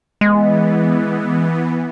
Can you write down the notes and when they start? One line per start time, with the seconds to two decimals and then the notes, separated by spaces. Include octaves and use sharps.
0.21 E3 G#3 B3